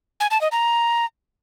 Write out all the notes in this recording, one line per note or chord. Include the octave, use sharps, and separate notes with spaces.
G#5
A5
D#5
A#5